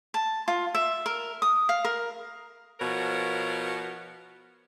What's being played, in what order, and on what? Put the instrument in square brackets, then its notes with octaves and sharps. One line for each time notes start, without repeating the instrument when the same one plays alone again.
[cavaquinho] A5
F4
E5
A#4
D#6
F5
A#4
[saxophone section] B2 F3 F#4 A#4 C#5